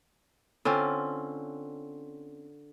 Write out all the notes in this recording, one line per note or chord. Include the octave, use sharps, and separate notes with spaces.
D3 C4 C#4 F4